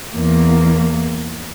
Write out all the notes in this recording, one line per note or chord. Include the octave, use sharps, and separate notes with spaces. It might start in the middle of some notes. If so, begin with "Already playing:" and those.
E2 A#3